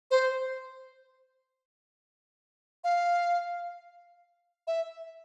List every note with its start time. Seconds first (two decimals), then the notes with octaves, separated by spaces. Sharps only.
0.11 C5
2.84 F5
4.67 E5